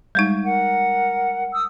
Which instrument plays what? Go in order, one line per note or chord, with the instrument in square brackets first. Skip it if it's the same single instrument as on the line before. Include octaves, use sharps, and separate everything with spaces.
[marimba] G3 G#3 D#4
[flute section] A#4 F#5
D#6 E6